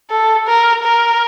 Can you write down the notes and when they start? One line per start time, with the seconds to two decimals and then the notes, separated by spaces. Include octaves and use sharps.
0.11 A4
0.47 A#4
0.84 A#4